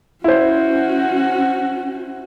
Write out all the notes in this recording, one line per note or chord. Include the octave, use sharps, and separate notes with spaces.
C#4 E4 F#4 C5